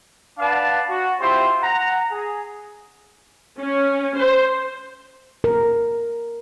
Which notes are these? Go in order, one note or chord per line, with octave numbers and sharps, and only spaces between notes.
D4 B4 D5 F5 F#5 A5
F#4
C4 E4 F4 G4 C5
F#5 A#5
G#4
C#4
C5
A#4